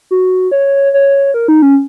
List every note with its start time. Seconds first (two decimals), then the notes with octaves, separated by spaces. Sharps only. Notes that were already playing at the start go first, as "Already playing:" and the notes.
0.11 F#4
0.51 C#5
0.94 C#5
1.34 A#4
1.48 D#4
1.62 C#4